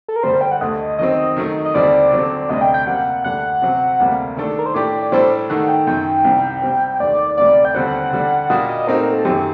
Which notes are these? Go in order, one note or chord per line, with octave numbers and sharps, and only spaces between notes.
A4
A#4
G2 D3 G3 C5
G5
F#5
D2 D3 A3 D#5
D#3 F#3 C4 D#5
D#3 F#3 A3 D#4
D#5
D#2 D3 G3 C4 D5
D3 F#3 C4
D2 C3 G3 D4 D#5
G5
G5
C3 G3 A#3 F#5
D2 D3 G3 D4 F#5
C3 F#3 C4
D2 C3 G3 A#3
D#3 A3 D4 A4
A#4
C5
A2 A3 D4 G4 D5
D5
A2 G3 D4 A4 C5
D#3 A3 D#4 A4 F#5
G5
F#2 D#3 F#3 G5
C2 C3 G3
C3 G3 C4
D#2 D#3 A3 D5
D2 C3 G3 D5
G5
D#2 D3 G3 C4 F#5
D3 G3 D4
A#2 G3 A#3 D4 F#4 D#5
D#5
A#2 A3 C4 D#4 F#4 A#4
A#4
A4
F#2 D#3 F#3 G4